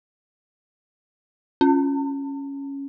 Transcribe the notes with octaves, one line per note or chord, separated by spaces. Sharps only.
C#4